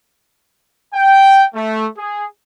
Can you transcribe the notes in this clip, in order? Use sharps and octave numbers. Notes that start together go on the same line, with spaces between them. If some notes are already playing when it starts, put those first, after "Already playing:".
G5
A3
G#4